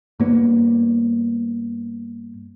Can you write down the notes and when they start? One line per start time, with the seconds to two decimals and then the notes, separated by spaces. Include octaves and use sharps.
0.20 G2 A#3 B3